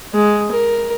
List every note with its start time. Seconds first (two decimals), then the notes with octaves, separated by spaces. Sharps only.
0.14 G#3
0.52 A#4